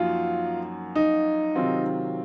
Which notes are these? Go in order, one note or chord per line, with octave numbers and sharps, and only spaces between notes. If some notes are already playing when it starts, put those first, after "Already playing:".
Already playing: F#2 F3 A#3 D#4 F4 F#4
D#4
C3 D#3 F#3 C4 F4